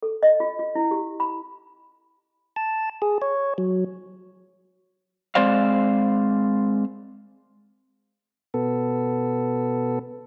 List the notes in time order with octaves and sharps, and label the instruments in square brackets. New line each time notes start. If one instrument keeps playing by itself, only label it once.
[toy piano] A4
D#5
F4
F4
E4
G4
B5
[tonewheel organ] A5
G#4
C#5
F#3
[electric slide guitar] G#3 C4 C5 D5 F5
[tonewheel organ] B2 B3 A4